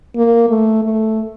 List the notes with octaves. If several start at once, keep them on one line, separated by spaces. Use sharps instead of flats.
A#3
A3
A3